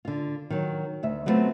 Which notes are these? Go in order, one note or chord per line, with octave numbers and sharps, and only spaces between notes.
D3 F4
D#3 F#3
D2 E5
F#3 G3 A3 B3 C4 F4